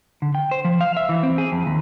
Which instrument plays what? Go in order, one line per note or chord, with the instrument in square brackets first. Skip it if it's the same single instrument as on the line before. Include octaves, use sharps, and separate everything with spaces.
[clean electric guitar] D3
G5
C5
F3
F5
E5
E3
C4
G#4
F2
D#2